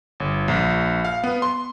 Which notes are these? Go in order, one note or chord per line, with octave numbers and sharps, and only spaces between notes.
G1
A#1
F5
B3
C6